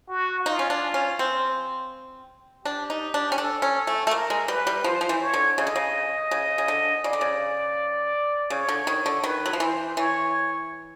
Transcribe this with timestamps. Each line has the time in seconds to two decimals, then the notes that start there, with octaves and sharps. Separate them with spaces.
0.09 F#4
0.46 D#4 F4
0.59 C#4
0.70 D4
0.94 C#4
1.19 C4
2.65 D4 G4
2.90 D#4
3.14 D4
3.32 C#4
3.38 D4 A4
3.62 C#4
3.87 A3
4.07 A3
4.11 A#3 A#4
4.30 G#3
4.48 G3 B4
4.67 G3
4.84 F3 C5
5.01 F3
5.09 E3
5.21 C#5
5.34 D3
5.58 C#3 D#5
5.67 D3
5.76 C#3
6.31 C#3
6.58 C#3
6.68 D3
7.04 C#3 D5
7.13 D3
7.21 C#3
8.50 C#3 C#5
8.69 D3
8.87 D#3
9.06 D3
9.23 D#3 B4
9.46 F#3
9.53 F3
9.60 E3 C5
9.97 E3 C#5